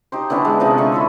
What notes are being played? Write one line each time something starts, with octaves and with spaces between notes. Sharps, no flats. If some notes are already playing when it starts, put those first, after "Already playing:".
D#4 G4 C5
D3 E3 B3 C#4
G#3
C3 F3 D#4 D#5
D3 C5 C#6
E4 A4 C#5